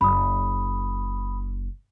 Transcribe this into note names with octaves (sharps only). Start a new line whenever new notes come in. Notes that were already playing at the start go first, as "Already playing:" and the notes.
F#1 B5 D#6